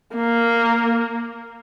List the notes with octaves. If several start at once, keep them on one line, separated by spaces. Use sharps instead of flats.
A#3